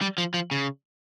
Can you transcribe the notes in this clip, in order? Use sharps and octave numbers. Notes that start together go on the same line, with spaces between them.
G3
F3
F3
C#3